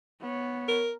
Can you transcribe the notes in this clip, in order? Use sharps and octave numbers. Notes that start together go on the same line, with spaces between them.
B3 C#5
A#4